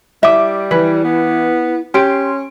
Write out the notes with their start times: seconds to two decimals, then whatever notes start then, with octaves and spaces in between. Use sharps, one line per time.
0.23 G3 E4 E5 D6
0.71 E3 E4 B4
1.05 B3
1.94 C#4 G4 C6 D7